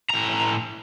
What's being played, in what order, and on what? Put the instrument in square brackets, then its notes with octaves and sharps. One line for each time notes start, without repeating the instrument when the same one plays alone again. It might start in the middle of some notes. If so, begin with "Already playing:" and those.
[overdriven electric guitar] A2 A#5